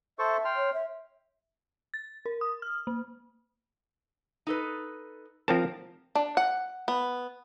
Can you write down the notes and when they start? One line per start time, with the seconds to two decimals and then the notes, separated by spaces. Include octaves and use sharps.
0.19 A4 C5 E5 C#6
0.45 G5 C6 F6
0.56 C#5
0.74 E5
1.94 A6
2.26 A#4
2.41 D#6
2.62 F6
2.87 A#3
4.47 D#4 A4 B4
5.48 F3 C4 A#4 A5
6.15 D4
6.37 F#5
6.88 B3